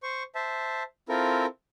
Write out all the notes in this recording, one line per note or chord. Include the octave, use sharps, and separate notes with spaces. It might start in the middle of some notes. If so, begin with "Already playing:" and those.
C5 C#6
C5 E5 A5
C4 E4 F4 A4 A#4